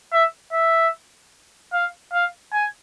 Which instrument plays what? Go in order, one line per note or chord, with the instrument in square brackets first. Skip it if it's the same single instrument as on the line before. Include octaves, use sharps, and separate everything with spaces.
[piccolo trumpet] E5
E5
F5
F5
G#5